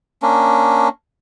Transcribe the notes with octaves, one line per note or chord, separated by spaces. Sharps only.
A#3 C#4 D4